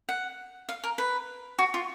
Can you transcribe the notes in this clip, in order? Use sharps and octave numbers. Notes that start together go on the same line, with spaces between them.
F#5
F5
A#4
B4
F#4
F4